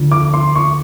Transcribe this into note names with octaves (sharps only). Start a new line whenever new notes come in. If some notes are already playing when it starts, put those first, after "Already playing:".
Already playing: D2 D3 F3
D6
C6
C#6